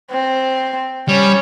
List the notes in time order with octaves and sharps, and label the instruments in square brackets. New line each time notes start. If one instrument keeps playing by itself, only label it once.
[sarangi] C4
[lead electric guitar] G3 [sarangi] C#4